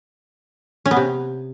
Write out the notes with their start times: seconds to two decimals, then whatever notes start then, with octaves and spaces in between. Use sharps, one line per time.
0.86 C#4
0.91 B3
0.96 C3